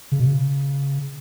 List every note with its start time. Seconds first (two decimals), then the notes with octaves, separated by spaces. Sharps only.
0.12 C#3
0.19 B2
0.26 C#3